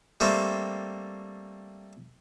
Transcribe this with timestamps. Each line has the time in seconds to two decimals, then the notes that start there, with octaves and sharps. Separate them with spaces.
0.20 G3 A3 A#3 C4